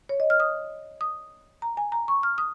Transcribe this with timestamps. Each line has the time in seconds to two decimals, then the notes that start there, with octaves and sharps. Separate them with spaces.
0.09 C#5
0.20 D#5
0.30 F6
0.40 D#6
1.01 D#6
1.62 A#5
1.77 G#5
1.92 A#5
2.08 C#6
2.23 F6
2.38 D#6